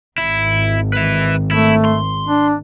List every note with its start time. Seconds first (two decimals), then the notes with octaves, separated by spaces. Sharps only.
0.18 G#1 E4
0.93 B4 E5
1.51 A3 E4
1.85 C6
2.27 D4